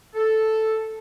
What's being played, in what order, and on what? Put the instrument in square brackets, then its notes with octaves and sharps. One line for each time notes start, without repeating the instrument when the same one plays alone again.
[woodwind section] A4